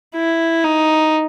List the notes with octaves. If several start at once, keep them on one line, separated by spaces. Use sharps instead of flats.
E4
D#4